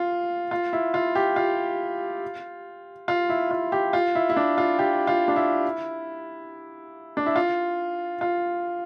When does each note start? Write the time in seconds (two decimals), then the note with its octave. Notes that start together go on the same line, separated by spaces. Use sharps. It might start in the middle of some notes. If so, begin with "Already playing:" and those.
Already playing: F4
0.51 F4
0.73 E4
0.94 F4
1.15 G4
1.36 F4
3.08 F4
3.29 E4
3.51 F4
3.72 G4
3.93 F4
4.15 E4
4.29 E4
4.37 D4
4.58 F4
4.79 G4
5.07 F4
5.28 D4
5.36 E4
7.17 D4
7.26 E4
7.36 F4
8.21 F4